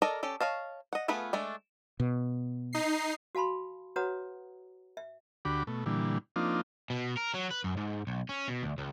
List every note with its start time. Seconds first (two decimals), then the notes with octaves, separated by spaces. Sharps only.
0.02 A4 A#4 D5 D#5 A#5
0.23 C#4 G4 A4
0.41 C#5 D#5 F5 A5
0.93 D#5 F#5
1.08 A3 B3 F4 G#4 B4
1.33 G#3 A3 D4
2.00 B2
2.73 D#4 C7
3.35 F#4 F5 A5 B5 C6
3.96 F#4 B4 C#5 F#5 A#5 D#6
4.97 E5
5.45 D2 D3 F#4 G4 B5 D6
5.67 B2 A3
5.86 A#2 D3 E3 G3
6.36 F3 A#3 C4 D4 D#4 F4
6.90 B2
7.17 A#4
7.34 F#3
7.50 B4
7.64 F#2
7.77 G#2
8.07 B1
8.29 C#4
8.48 B2
8.63 D2
8.78 C#2